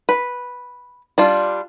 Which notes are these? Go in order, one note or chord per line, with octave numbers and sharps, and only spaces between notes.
B4
G3 D4 F4